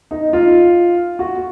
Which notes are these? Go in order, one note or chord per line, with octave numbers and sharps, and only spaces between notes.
D#4
F4
F#4